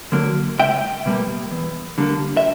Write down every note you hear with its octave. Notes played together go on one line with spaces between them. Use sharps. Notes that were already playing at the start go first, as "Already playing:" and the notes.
D3 F#3 A#3
C#2 E5 G5
B2 G3 A#3
E2
D3 G3 A#3
E5